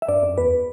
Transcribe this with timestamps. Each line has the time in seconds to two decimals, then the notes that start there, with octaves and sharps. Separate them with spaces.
0.02 E5
0.08 G2 D5
0.23 F#2
0.38 E2 B4